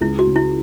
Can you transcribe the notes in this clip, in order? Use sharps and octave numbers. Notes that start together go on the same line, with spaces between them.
C#2 E4
F#4
C#3
E4